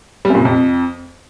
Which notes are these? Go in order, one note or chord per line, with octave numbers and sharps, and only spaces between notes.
G3
F#2
A#2
C3
F2